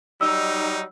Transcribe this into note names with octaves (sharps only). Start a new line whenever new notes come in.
F#3 G3 D#4 E6